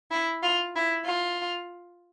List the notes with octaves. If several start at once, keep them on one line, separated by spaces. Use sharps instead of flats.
E4
F4
E4
F4